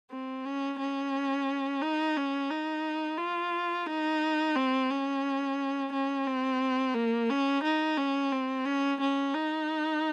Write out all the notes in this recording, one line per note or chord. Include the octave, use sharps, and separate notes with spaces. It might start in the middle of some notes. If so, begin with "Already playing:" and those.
C4
C#4
C#4
D#4
C#4
D#4
F4
D#4
C4
C#4
C#4
C4
A#3
C#4
D#4
C#4
C4
C#4
C#4
D#4